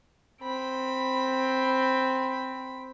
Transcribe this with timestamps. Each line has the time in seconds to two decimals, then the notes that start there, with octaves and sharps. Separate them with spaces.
0.42 C4 B5